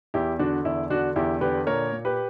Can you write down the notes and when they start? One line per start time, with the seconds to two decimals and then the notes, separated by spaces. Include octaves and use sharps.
0.14 E2 E4 G4
0.39 D3 D4 F#4
0.65 E2 E4
0.90 D3 D4 F#4
1.16 E2 E4 G4
1.41 D3 G4 B4
1.67 A#2 A#4 C#5
1.92 A#2
2.05 G4 B4